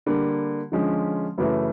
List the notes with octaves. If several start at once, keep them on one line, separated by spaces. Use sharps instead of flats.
D3 G3 A#3
D3 F3 G#3 C#4
F#2 C#3 E3 A3